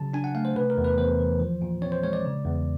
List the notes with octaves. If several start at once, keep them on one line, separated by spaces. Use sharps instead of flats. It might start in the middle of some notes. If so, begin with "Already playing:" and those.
Already playing: C#3 F#3 A5
D4 G#5
F#5
A3 F5
C5
C3 B4
A#4
E2
B4
E2 C5
E3
F3
A#2
C4 C#5
C5
G#3 C#5
D5
C#3
E2